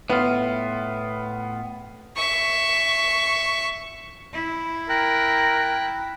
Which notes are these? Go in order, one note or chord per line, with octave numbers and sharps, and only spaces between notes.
A2 B3 F4
E5 C#6
E4
A#4 G5 F#6